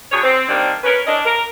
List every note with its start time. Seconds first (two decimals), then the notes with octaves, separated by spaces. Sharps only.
0.11 D3 F#3 G#4 C#5
0.24 C4
0.49 D3 D#3 G3 A#3 C4 D4
0.84 C#4 A#4 B4
1.07 C#4 D4 E4 A#4 D5 D#5
1.26 A#4